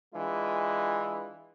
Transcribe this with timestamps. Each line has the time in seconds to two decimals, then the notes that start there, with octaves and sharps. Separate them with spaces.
0.14 E3 G#3 D4 F4